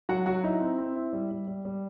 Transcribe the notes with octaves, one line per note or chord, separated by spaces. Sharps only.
F#3 F#4 F#5
F#3 F#4 F#5
D#4 E4 E5
C4
C4
E4
G3
G3
G3
G3